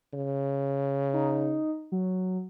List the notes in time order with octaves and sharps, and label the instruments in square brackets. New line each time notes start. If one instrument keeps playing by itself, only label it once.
[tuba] C#3
[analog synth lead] D#4
F#3